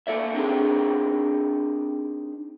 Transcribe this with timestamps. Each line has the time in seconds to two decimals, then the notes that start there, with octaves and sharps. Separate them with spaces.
0.07 A#3 A4 D5 E5
0.34 C4 D4 D#4 G4 G#4 A#4